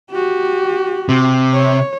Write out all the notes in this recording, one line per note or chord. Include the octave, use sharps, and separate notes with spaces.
F#4 G4
C3
C#5